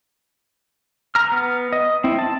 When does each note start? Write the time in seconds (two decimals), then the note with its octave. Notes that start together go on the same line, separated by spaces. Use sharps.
1.15 A#5 F6
1.32 B3
1.73 D#5
2.04 C4 E4
2.19 A5